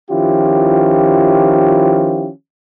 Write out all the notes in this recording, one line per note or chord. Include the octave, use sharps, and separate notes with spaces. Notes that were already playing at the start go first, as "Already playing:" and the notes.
D#3 F3 C#4 E4 F4 G4